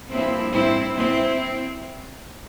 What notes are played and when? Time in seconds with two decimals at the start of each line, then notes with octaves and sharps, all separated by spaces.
0.10 G2 F3 A#3 C4 E4
0.53 C4 E4
0.95 C4 E4